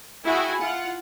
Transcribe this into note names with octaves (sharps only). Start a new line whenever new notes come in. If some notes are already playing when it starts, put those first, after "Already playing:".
E4 F#4 G#4 G5 G#5
F4 F#5